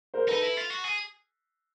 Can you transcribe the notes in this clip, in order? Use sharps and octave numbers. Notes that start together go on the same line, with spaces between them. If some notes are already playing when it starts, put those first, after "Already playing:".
A#4 C5
D#4 A4 B4
E4
F4
F#4
G#4